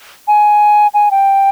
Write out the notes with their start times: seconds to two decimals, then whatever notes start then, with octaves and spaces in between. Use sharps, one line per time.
0.28 G#5
0.94 G#5
1.11 G5